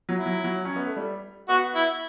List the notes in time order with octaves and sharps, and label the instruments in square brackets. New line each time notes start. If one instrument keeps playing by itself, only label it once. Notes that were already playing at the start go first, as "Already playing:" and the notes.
[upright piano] F#3
[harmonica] E4
[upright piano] F#3
F#3
C#4
B3
A3
G3
[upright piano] B3 [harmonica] F#4
[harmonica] E4